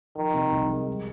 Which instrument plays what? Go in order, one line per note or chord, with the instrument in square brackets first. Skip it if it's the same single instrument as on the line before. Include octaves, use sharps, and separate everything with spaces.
[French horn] D#3 [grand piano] F3
[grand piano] C3
C2
G#3
G3